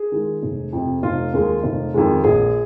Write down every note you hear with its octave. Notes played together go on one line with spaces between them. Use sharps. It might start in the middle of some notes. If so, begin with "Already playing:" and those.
Already playing: G#4
D#3 G#3 F4
F1
F2 C3
F1 F4
D#2 D#3 G#3
F1
F2 D#3 G#3
A#1 G#4